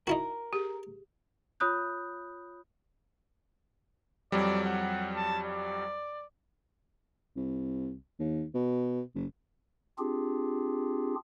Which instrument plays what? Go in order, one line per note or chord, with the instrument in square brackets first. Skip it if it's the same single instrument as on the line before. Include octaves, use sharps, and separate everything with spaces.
[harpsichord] D#4 E4 F#4 [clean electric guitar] A#4
[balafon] G4 G#4
[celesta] F4 C#5 B5 D#6 F#6 G6
[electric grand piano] F2 F#3 G3 [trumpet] D5
[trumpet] F#5
A5
D5
[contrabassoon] C2
D#2
B2
F#1
[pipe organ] C4 D4 F4 G4 G#4